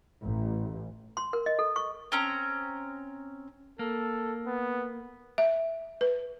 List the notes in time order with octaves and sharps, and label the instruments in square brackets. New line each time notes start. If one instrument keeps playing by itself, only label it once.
[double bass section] A1
[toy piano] C6
A#4
D#5
A4
C#6
[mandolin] C4 C#4 A#5
[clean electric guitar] A#3 [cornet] A4
[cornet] B3
[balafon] E5
B4